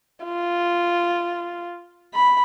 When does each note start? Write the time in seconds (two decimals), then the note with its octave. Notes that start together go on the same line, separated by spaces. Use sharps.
0.25 F4
2.14 B5